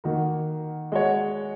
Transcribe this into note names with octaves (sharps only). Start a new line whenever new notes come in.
D#3 A#3 F#4
G#3 F#4 C#5